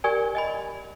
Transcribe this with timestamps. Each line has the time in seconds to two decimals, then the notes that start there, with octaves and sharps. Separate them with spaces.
0.04 G4 A#4 D5 G#5
0.35 D#5 G#5 B5